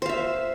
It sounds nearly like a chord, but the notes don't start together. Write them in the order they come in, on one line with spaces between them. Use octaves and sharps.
C5 F5 E5